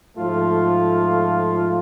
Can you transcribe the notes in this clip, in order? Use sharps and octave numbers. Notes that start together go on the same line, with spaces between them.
G#2 F3 A3 F4 A4